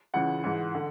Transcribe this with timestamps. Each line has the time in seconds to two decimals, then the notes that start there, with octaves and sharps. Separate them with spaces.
0.14 C#2 C#3 E3 F#5
0.43 G#2 E3
0.75 D3